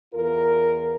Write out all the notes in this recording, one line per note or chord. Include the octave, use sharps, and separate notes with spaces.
E2 F4 A#4